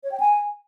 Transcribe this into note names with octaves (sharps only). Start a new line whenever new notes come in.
C#5
G5
G#5